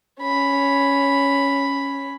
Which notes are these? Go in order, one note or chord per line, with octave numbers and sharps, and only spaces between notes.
C#4 B5